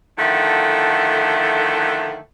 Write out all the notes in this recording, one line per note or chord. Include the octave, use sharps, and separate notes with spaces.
D3 D#3 F3 A3 E4 F#5